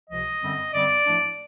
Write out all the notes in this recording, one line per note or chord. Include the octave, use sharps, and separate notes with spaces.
C#2 C3 F3 G#3 D#5
F#2 D3 G3 C4
F#2 D3 G3 C4 D5
A2 F3 A3 D4